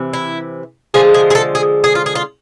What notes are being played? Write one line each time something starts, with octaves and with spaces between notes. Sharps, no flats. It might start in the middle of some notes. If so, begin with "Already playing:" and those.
Already playing: C3 E3
E4
D3 F3 G#3 G#4
G#4
G#4
A4
G#4
G#4
F4
G#4
F4